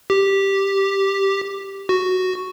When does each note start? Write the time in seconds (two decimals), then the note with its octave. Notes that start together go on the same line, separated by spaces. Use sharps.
0.10 G4
1.89 F#4